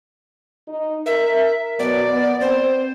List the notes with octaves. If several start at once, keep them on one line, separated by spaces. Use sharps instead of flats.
D#4
A#4 E5
B2 F#3 B3 D5
B3
C4 C5